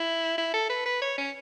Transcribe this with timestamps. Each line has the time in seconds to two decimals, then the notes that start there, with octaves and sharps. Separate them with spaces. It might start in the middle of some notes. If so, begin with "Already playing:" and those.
Already playing: E4
0.38 E4
0.54 A4
0.69 B4
0.86 B4
1.02 C#5
1.18 C#4